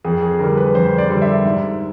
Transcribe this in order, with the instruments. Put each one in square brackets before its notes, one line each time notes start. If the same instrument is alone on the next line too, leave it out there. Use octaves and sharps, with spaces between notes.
[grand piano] F2 G#4
G#4
D3 G3 A#4
B4
F2 C5
D5
D3 G3
E5
G#2